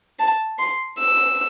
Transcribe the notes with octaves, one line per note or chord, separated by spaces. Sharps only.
A5
C6
E6